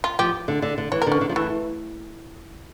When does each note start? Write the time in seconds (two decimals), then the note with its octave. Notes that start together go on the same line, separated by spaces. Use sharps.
0.04 F4
0.19 F3 G4
0.48 D3
0.62 D3
0.78 D3
0.92 E3 C#5
1.02 D3 A#4
1.12 C#4
1.21 D3
1.29 F3
1.36 E3 A3